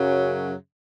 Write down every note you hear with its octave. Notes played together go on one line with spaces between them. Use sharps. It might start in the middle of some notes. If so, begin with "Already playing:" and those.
Already playing: F#2 C#3 F#3